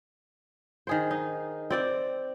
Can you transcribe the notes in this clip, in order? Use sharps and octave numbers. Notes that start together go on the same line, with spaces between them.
D#3 G#4 C5
D#4
C4 D5 G5